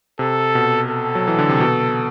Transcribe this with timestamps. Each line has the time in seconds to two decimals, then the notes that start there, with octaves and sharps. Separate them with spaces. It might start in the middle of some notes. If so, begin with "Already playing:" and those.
0.19 C3 A4
0.55 B2
0.90 A4
1.15 F#3
1.28 E3
1.38 D3
1.49 C3
1.60 B2